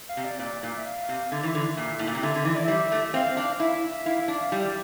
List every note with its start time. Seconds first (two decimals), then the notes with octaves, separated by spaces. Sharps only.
0.09 F5
0.17 C3
0.24 D5
0.39 A#2 D5
0.63 A#2
0.77 E5
0.85 F5
1.09 C3
1.31 D3 E5
1.43 E3
1.55 D3
1.77 A#2
1.99 A2
2.07 A#2
2.15 C3
2.23 D3 E5
2.35 D3
2.45 E3 E5
2.55 D5
2.65 G3 E5
2.92 A3
3.05 E5
3.14 C4 F5
3.37 D4 F5
3.53 F5
3.60 E4 E5
4.06 E4 F5
4.21 E5
4.28 D4
4.36 F5
4.52 G3 E5